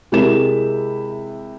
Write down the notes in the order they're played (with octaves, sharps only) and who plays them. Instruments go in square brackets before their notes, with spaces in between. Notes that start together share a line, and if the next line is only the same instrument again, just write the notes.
[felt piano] C3 G#3 E4 G4 A#4 E7